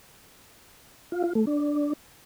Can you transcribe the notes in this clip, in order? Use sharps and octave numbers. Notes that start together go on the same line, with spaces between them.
F4
F4
A3
D4